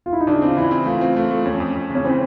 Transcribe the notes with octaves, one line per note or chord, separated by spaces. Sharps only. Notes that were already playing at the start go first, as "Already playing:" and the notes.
F4
E4
D#4
C#3 D4
C4 F4
E3 E4
C4
A3 F4
C4
A3 F4
A3
F2 C#4
F2
F2
C#3
C#4
E3 C4